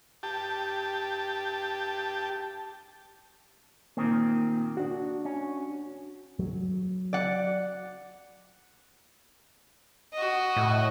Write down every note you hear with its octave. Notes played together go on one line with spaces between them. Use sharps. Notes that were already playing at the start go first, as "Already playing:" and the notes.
G4 A5
A#2 D#3 A#3 C4
D4 F#4
C#4
F#3
D5 F#5
F#4 D#5
A2